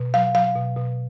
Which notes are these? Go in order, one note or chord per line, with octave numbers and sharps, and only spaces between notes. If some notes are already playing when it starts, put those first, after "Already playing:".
Already playing: B2
F#3 F5
F#3 F5
B2
B2